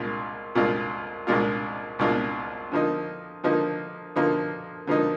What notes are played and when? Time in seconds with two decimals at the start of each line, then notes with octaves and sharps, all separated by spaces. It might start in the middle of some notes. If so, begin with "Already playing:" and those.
Already playing: C2 A#2 G#3 D4 F4
0.55 C2 A#2 G#3 D4 F4
1.27 C2 A#2 G#3 D4 F4
1.99 C2 A#2 G#3 D4 F4
2.72 D3 F3 A#3 D#4
3.44 D3 F3 A#3 D#4
4.16 D3 F3 A#3 D#4
4.87 D3 F3 A#3 D#4